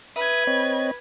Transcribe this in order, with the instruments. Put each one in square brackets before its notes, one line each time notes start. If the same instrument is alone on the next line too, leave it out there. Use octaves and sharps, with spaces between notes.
[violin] B4 G#6 [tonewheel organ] E5 D#6
[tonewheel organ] C4 C#5 D#5